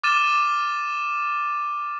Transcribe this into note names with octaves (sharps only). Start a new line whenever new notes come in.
D6 F6 A6 D#7 E7